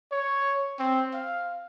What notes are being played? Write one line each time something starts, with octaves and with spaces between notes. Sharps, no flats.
C#5
C4
F5